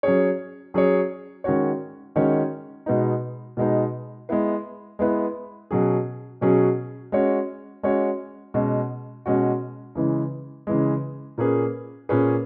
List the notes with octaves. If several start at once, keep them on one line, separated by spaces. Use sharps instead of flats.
F#3 C#4 G#4 C#5
F#3 C#4 G#4 C#5
D#3 G#3 C#4 F#4 C#5
D#3 G#3 C#4 F#4 C#5
B2 G#3 B3 D#4
B2 G#3 B3 D#4
G#3 B3 E4 B4
G#3 B3 E4 B4
B2 F#3 C#4 G#4
B2 F#3 C#4 G#4
G#3 C#4 F#4 C#5
G#3 C#4 F#4 C#5
B2 G#3 C#4 F#4
B2 G#3 C#4 F#4
C#3 E3 G#3
C#3 E3 G#3
A#2 A#3 C#4 G#4 B4
A#2 A#3 C#4 G#4 B4